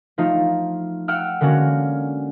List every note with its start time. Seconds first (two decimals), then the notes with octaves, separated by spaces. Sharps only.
0.18 F3 A3 D#4 F4
1.08 F#5 G5 E6 F6
1.41 D3 G#3 A#3 C#4 F#4